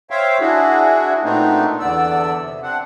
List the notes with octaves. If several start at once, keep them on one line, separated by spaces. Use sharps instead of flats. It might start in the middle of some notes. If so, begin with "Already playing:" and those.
C5 C#5 E5 F5 G5
D4 E4 F#4 G#4
A#2 A3 B3 C4 D4 D#4
E2 D3 B3 D5 E6
C3
C4 D4 F#5